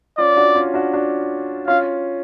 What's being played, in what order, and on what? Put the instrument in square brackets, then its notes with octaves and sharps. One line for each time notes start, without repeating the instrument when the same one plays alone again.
[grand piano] C#4 F4 [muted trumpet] D5
[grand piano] D4 F#4
C#4 F4
D4 F#4
D4 F#4
[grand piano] C#4 F4 [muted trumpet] F5